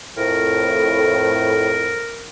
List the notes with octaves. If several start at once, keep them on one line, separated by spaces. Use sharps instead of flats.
F2 A2 A#4